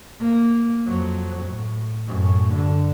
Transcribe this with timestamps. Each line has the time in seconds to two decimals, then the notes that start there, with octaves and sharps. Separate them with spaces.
0.20 A#3
0.86 F2 F#3
1.46 A2
2.08 F#2 A2
2.53 D3